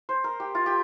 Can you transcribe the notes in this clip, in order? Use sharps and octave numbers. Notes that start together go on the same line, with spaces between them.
C5
A#4
G4
F4
G4